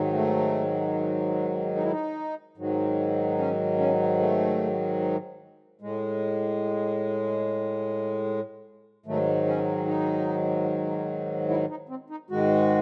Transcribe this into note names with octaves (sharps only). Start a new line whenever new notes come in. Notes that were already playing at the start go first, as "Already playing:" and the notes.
Already playing: G#2 D#3 F#3
A3
D#4
E4
D#4
G#2 D#3 F#3
C#4
C#4
A3
A2 G#3
G#2 D#3 F#3 A3
C#4
D#4
E4
D#4
C4
D#4
G#2 D#3 G#3 F#4